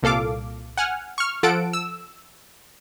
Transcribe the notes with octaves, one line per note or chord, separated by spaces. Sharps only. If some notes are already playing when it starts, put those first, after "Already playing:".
C2 A#2 A4 F5 D6
F#5 G#5 F6
C#6 F6
F3 A4 F#5 A5 D7
E6